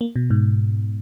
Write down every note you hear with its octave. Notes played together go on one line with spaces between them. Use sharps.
A#3
B2
G#2